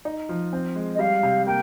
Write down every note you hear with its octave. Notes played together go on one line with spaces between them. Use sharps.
D#4
F3
C4
G#3
D#5
G3 F5
C3
A#3 G5